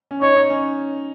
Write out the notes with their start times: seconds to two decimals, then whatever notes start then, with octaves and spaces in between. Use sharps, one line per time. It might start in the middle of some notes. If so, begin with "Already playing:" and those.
0.11 C#4
0.21 D#4 C#5
0.36 D#4
0.50 C#4